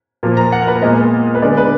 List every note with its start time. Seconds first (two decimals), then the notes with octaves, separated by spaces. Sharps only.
0.23 A#2 F3 A#3
0.37 A#5
0.52 F#5
0.62 A#4
0.67 B4
0.82 A#2 G#3 B3 D#5
1.35 B4
1.42 D3 G#3 B3 D5
1.57 B4